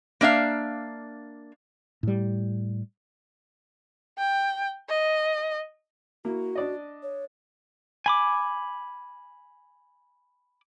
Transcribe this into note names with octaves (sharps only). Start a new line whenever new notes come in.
A#3 D4 E5 F5
A2 G3
G5
D#5
A#3 E4 F#4
D4 D5 D#5
C#5
G#5 B5 D6